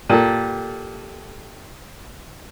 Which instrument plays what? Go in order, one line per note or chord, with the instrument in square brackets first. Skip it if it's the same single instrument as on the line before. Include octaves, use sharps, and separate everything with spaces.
[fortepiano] A#2 [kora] G4 A4